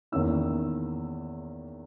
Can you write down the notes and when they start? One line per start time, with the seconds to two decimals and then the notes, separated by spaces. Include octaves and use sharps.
0.12 E2 D#3 A#3 C#4 E4 E6